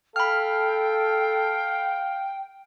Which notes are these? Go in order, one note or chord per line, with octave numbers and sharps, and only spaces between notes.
A4 F5 G5 B5 F6